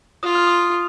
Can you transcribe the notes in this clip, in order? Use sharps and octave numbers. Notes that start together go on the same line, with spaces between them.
F4 D#6
F6
D#6